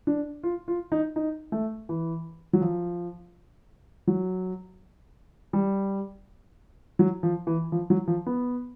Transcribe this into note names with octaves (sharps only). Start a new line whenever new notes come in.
D4
F4
F4
D#4
D#4
A3
E3
F#3
F3
F#3
G3
F#3
F3
E3
F3
F#3
F3
B3